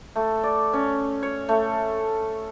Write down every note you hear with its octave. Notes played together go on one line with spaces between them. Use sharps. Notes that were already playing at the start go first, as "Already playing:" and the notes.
A3
D5
C#4
C#5
A3